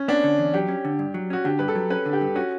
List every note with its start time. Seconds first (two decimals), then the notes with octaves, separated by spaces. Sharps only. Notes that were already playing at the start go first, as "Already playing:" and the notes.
Already playing: C#4
0.08 B3 D4
0.24 D3
0.38 E2
0.54 F#3 G4
0.69 C#4
0.85 D3
0.99 G2
1.14 F#3
1.30 C#4 F#4
1.45 D3 G4
1.59 G2 B4
1.68 A4
1.75 F#3
1.90 C#4 B4
2.06 D3
2.13 G4
2.21 G2
2.35 C#4 F#4